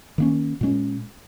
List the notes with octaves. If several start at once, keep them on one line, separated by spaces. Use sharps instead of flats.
D#3 A#3 C#4
A#2 G#3 C#4